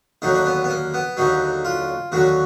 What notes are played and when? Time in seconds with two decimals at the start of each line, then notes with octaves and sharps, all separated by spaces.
0.22 D#2 D3 F#3 D#4
0.34 D4
0.46 B3
0.64 B3
0.70 A#3
0.94 B3
1.17 D#2 D3 F#3 D#4
1.65 F4
2.12 D#2 D3 F#3 F#4